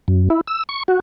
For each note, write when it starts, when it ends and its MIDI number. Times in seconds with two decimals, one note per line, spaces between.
0.08 0.29 42
0.30 0.41 64
0.47 0.63 88
0.69 0.83 85
0.88 1.00 66